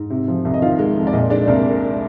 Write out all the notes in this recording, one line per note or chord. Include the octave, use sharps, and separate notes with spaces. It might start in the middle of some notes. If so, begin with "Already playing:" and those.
Already playing: G#2
C3
F3
C2
D#5
D#3 F4 F5
G#3
F2
D5
A#2 D#4 D#5
G#3 D4 D5
C2 A#3 A#4